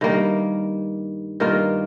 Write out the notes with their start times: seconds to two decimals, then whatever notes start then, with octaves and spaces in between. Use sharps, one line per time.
0.01 G2 D#3 G3 A#3
1.40 G2 D#3 A#3 F4